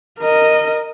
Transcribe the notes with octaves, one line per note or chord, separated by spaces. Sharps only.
A#4 D#5